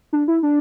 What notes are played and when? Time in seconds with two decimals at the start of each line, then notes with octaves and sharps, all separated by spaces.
0.13 D4
0.28 E4
0.43 D4